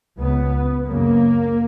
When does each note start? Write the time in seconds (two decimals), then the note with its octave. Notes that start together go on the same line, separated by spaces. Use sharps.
0.18 C#2 C#3 B3
0.87 F#2 C#3 A#3